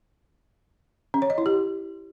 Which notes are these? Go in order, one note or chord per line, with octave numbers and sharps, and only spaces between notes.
C#4
C#5
D#5
E4
G4